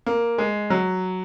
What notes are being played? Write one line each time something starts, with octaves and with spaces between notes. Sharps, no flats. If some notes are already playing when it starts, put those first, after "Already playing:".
A#3
G#3
F#3